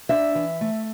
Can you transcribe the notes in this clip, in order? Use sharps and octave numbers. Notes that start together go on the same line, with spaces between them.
D4 E5
E3
A3